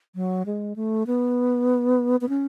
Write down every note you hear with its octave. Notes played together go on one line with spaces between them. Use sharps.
F#3
G#3
A3
B3
B3
C#4